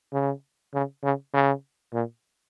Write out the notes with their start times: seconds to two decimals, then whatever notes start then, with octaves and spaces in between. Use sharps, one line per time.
0.12 C#3
0.74 C#3
1.03 C#3
1.33 C#3
1.93 A#2